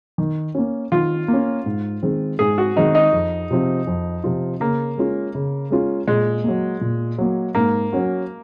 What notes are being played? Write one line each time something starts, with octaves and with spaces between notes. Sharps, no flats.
D#3
A#3 C#4
D#3 F4
A#3
C#4
G#2
D#3 G#3 C4
G#2 G#4
F#4
D#3 G#3 C4 D#4
D#4
F2
C3 F3 C4 F4
F2
C3 F3 C4 F4
C#3 A#3
G#3 C#4 F4
C#3
G#3 C#4 F4
A#2 G#3
F#3 A#3
A#2
F#3 A#3
G#2 A#3
F#3 C#4 F#4